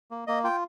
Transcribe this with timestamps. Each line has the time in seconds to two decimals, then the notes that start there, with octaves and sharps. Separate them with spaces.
0.11 A#3
0.27 A#3 D#5
0.44 F4 G5